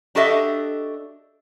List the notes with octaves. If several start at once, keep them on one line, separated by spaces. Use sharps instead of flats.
D4 F#4 G4 A4 D#5 E5